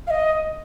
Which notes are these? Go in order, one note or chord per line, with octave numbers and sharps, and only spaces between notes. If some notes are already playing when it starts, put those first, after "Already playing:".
F5
D#5